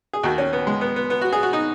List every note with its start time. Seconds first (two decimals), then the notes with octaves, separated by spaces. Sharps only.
0.13 G#4
0.23 D#2 D#3 F#4
0.38 C#4
0.53 B3
0.67 G#3
0.81 B3
0.96 B3
1.10 B3
1.21 F#4
1.33 G#4
1.43 F#4
1.53 D#4